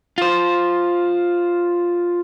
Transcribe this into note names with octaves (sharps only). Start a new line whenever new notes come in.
F4 C5